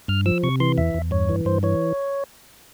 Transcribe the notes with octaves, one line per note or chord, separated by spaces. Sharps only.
G2 F6
F3 E6
C3 C#6
E3 C6
E2 E5
E2
G2 C#5
E3
G2 C5
E3 C#5